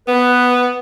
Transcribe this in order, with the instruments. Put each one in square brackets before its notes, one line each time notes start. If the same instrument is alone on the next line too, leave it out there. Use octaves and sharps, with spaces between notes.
[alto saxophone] B3 [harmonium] B4